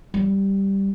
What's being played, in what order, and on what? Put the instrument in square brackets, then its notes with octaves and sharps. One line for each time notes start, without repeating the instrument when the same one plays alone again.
[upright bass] G3